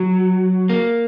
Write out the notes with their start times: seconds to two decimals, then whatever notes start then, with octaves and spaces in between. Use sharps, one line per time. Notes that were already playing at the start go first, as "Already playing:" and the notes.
Already playing: F#3
0.69 A#3